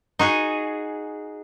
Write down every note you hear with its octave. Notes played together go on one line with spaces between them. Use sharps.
D#4 F#4 G#4